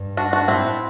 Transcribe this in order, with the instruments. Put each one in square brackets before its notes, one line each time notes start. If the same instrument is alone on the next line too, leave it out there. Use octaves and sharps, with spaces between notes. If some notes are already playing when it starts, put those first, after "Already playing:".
Already playing: [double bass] G2
[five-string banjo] D4 F#4
D4 F#4
[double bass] A2 [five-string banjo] C4 E4